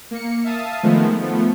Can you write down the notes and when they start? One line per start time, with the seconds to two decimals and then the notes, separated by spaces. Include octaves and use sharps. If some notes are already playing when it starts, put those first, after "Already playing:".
0.11 A#3 C#7
0.44 E5 F5 A5 D#6
0.83 D#3 F3 G#3 A3 B3
1.21 F3 A3 B3